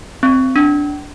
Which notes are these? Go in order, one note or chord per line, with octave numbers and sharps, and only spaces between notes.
C4
D4